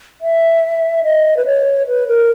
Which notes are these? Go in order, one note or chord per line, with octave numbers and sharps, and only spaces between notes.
E5
D#5
B4
C#5
B4
A#4